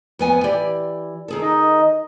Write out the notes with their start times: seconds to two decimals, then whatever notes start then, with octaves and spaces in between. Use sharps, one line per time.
0.19 F2 B3 G#5
0.44 E3 G4 D5
1.28 D#3 G#4 A4
1.42 D#4 D#5